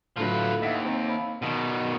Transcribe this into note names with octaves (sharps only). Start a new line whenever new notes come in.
A2 D3 F3 F#3 B4
D#2 E5 F#5
C4
B5
B2 D#3